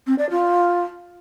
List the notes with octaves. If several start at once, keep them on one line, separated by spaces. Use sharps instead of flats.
C4
D5
F4